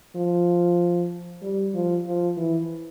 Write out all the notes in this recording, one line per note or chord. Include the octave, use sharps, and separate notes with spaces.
F3
G3
F3
F3
E3